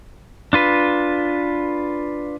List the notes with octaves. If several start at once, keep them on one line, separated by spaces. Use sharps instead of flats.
D4 F4 B4